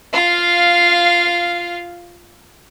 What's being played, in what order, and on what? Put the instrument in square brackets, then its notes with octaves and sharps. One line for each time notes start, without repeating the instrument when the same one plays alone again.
[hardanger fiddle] F4 F5